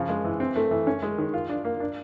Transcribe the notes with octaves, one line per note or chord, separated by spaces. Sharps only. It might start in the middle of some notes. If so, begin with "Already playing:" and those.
Already playing: C#3 F3
G#3
E3
C4
A3
E3
C#4
G#3
D#3
F4
D4
A#3
D4